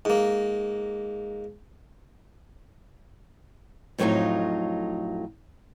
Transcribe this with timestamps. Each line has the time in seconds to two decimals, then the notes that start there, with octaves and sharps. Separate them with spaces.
0.05 G#2 A#3
3.98 F2 A2 F#3 C#4 D#4 F4